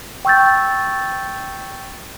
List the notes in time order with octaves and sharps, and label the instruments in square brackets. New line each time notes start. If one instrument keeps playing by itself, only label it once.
[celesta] G5 C#6 E6 G6 A6